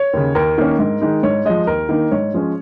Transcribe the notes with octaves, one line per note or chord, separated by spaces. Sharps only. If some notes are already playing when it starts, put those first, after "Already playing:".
Already playing: C#5
D#2 C#3
D#2 A#4
D#3 A#3 C#4
G#2
D#3 G#3 D#4
G#2 C#5
F3 G#3 D#5
D#2 A#4
D#3 A#3 D#4
G#2 C#5
F3 G#3 C#4